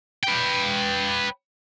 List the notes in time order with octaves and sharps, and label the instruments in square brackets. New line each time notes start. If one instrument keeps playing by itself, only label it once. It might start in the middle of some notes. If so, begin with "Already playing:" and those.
[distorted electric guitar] B4 G5